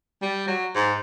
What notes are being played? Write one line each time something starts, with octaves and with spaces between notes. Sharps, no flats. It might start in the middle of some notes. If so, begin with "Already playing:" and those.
G3
F#3
G#2